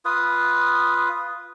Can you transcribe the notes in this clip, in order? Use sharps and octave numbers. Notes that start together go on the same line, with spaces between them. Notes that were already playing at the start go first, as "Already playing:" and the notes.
F4 B4 D#6